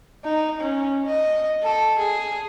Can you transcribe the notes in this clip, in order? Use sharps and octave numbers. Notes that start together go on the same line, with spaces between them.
D#4
C#4
D#5
A4
G#4